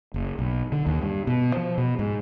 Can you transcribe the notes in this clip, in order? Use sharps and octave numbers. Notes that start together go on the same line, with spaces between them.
F#1
B1
D3
D#2
G2
B2
F3
B2
G#2